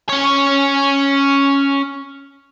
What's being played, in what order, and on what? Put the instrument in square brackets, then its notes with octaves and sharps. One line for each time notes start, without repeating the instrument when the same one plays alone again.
[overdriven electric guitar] C#4 C#5